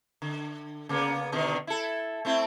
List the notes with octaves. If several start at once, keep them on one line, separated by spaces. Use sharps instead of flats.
D3
C#3 A#3 B3
B2 D3 D#3
E4 A4
A3 C4 E4